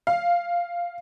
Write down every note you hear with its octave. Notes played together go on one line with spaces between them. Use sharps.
F5